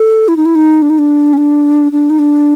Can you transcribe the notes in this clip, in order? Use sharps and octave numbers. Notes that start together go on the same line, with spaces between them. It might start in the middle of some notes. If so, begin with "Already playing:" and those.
Already playing: A4
E4
D#4
E4
D#4
D4
D#4
D4
C#4
D4
D4
D#4
D4